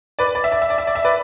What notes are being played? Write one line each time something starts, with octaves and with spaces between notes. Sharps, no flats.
B4 D5
D5
E5
D5
E5
D5
E5
D5
E5
B4 D5